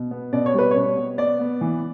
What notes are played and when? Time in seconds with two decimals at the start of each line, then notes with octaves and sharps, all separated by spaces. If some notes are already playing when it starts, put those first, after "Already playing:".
Already playing: B2
0.11 B3
0.33 B2 D5
0.46 C#5
0.54 G3 B4
0.71 B2 C#5
0.97 B3
1.18 B3 D5
1.40 B3
1.61 E3